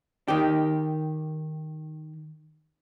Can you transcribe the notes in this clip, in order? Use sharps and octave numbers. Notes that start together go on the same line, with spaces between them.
D#3 G4